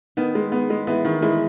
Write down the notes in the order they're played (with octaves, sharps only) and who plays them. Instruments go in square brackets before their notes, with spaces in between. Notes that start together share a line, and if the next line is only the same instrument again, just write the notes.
[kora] D#3 [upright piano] B3
[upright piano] G#3
B3
G#3
[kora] E3 [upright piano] B3
[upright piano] D#3
[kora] E3 [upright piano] G#3